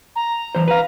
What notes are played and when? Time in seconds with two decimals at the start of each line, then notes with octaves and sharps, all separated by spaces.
0.16 A#5
0.55 E3 C5
0.68 B4 F5 A#5